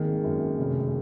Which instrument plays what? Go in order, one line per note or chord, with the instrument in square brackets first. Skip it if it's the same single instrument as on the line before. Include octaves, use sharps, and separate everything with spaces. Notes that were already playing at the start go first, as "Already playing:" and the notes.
Already playing: [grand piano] G#1 A#3 [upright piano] D#3 G#3
[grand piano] F#2
F1